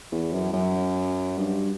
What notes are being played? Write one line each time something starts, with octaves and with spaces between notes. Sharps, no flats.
E2
F#2
F#2
G2